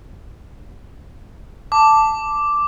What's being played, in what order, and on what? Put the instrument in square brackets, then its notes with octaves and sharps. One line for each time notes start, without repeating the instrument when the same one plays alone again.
[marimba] A5 [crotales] D6